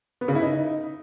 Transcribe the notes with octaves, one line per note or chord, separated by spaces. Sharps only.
B3
C#3
E4
D#4